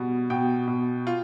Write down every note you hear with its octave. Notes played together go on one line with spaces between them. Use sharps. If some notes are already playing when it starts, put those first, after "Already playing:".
Already playing: B2 G3
B2 G5
B2
F4